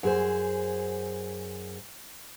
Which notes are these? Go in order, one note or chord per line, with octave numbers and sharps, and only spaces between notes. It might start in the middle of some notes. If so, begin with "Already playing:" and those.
F#2 G#4 C5